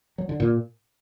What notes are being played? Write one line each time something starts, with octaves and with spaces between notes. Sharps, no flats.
F#3
D3
A#2